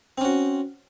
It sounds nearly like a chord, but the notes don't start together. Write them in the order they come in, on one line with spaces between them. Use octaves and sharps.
C4 C#4 F#4